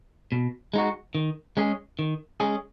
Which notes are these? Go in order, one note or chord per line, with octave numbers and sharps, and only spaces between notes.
B2
G#3 D#4 F#4
D#3
G#3 C#4 G#4
D#3
G#3 C#4 G#4